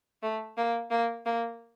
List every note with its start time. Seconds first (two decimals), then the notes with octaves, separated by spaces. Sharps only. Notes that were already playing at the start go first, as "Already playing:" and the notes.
0.23 A3
0.58 A#3
0.91 A#3
1.26 A#3